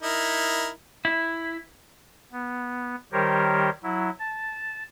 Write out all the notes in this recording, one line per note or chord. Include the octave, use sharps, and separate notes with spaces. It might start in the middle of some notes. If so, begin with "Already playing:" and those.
D#4 E4 A#4
E4
B3
D#3 G3 G4 A#4 C5 C#5
F#3 E4
A5